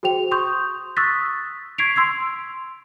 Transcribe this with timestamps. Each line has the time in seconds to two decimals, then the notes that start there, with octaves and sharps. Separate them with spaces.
0.03 F#4 G#4 C5 G5 F7
0.31 C6 C#6 D#6 G6
0.97 C#6 D#6 E6 F#6 A6 B6
1.78 C#6 G#6 B6 C7 D7 F7
1.96 C6 E6 G#6 C7